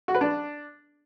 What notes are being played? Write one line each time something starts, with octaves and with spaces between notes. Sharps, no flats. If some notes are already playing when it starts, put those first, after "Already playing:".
F#4
B4
D4